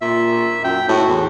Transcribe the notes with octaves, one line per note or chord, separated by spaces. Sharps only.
A#2 E5
F#2 G5
A2 F#4
E2